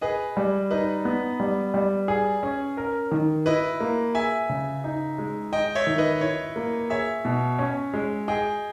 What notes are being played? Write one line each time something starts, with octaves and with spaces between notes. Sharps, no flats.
G#4 B4 D#5
G3
D#4 B4 D#5
B3
G3
G3
G#4
C#4
A#4
D#3
E4 B4 D#5
A#3
G#4 E5 G#5
C#3
D#4
G#3
G#4 D#5 G5
C#5 E5
D#3
B4 D#5
E4 C#5
A#3
G#4 C#5 E5
B2
C#4
G#3
G#4 D#5 G5